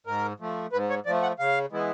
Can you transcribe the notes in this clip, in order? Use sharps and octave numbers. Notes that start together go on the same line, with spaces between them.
G#2 A#4
F3 A3
G#2 B4
C#5
F3 A3 D5
F#5
C#3 F5
E3 G#3 B3 E4